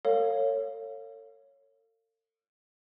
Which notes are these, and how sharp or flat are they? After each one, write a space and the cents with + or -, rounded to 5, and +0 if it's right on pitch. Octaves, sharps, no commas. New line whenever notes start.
A4 +45 C#5 +0 F5 +0